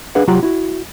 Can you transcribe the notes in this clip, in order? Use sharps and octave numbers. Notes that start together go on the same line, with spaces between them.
D4 G#4 B4 F5 F#5
C2 F#3 F4 G4 F#5 A#5
E4 F#4